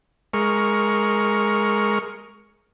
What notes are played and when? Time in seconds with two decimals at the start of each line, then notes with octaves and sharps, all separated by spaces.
0.33 G#3 A#4 C#6